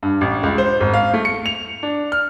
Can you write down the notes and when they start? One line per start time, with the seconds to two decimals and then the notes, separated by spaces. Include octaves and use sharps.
0.03 G2
0.21 A1
0.43 C#2
0.58 C5
0.81 G#1
0.94 F5
1.14 A3
1.25 C#7
1.46 F7
1.83 D4
2.12 F6